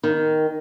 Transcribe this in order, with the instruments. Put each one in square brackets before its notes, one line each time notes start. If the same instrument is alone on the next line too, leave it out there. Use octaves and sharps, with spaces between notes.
[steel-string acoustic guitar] D#3